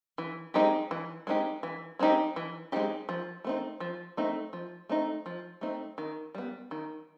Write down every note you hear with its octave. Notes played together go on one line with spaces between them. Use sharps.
E3
G#3 C4 D#4 G4
E3
G#3 C4 D#4 G4
E3
G#3 C4 D#4 G4
E3
G#3 C4 D#4 G4
F3
A3 C4 D#4
F3
A3 C4 D#4
F3
A3 C4 D#4
F3
A3 C4 D#4
D#3
G3 B3
D#3